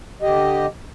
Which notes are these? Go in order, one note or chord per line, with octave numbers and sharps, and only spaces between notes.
D3 G4 D#5